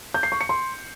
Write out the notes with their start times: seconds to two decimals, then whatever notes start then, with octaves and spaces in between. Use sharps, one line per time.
0.14 G6
0.23 C7
0.32 C#6
0.41 C#7
0.49 C6